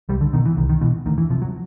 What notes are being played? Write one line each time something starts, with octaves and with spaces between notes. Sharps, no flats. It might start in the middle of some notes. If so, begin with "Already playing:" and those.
C2 G3
D3
B2 D#3
E3
C2 D#3
D#3
B2 E3
D2 D#3
E3
C3 F3
F#3